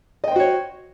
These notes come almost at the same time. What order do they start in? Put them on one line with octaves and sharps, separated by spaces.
D#5 G5 C5 F#4 C#5